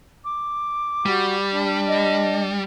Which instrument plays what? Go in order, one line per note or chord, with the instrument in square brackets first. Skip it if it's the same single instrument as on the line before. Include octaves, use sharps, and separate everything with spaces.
[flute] D6
[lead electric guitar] G3 [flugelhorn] F#4
[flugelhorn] D4
[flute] D#5